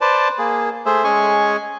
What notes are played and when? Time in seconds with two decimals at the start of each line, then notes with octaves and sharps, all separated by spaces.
0.01 B4 C5 D5 A5
0.38 A#3 G#4
0.85 A3 G#4 C5 E5
1.04 G#3 C#4 G#4 G#5 C#6